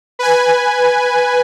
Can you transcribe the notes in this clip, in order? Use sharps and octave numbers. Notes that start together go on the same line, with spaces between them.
B4 G#5